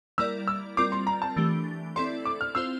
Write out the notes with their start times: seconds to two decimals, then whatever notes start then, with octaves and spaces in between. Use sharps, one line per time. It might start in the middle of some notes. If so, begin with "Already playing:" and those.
0.18 G3 A#3 E4 A#4 D5 E6
0.48 E6
0.77 G3 C4 F4 A#4 D5 D6
0.92 C6
1.07 A#5
1.22 A5
1.36 E3 A3 D4 G4
1.96 C4 E4 A4 D5 C6
2.25 D6
2.41 F6
2.55 C4 F4 C5 E6